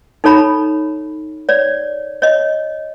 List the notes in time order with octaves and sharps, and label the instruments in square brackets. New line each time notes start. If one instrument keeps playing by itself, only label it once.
[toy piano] D#4 A4 C#5 A#5 B5
C#5 D5
C#5 D#5